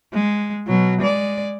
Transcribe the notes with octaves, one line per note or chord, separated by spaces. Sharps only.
G#3
B2 F#3
G#3 D5